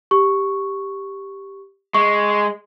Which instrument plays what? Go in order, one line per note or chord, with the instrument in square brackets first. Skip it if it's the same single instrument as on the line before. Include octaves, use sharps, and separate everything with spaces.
[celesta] G4 C#6
[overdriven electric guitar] G#3 [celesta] C#6